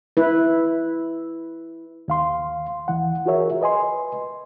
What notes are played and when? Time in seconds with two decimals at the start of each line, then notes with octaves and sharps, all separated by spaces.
0.17 E4 B4
2.08 D#2 F5 C6
2.88 D#2 E3 F#5
3.26 F4 F#4 G#4 A#4 C#5 E5
3.61 B4 D#5 G#5 C6